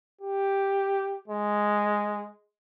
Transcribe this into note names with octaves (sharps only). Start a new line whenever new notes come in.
G4
G#3